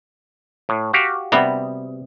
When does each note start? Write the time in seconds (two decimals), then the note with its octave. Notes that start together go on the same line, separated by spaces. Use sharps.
0.69 A2
0.93 F#4 G4 F5
1.32 C3 G3 B3